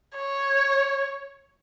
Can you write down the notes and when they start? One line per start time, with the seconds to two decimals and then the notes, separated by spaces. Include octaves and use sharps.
0.17 C#5